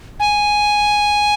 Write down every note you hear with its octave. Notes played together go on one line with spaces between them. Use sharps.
G#5